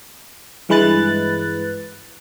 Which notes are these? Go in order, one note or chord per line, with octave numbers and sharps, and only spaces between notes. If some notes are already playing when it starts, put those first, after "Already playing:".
G2 E3 G#3 B4 F#6 A6